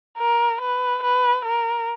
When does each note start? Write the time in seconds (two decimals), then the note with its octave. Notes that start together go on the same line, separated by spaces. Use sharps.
0.18 A#4
0.61 B4
1.03 B4
1.45 A#4